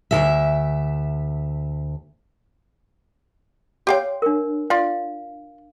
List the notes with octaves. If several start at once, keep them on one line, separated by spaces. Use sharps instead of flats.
D2 C#3 E5
G4 C#5 F5 G5 C6
D4 A#4
F4 D5 F5